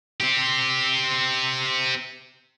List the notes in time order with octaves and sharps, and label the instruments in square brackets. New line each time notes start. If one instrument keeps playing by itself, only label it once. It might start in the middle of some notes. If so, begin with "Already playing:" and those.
[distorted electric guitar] C4 G4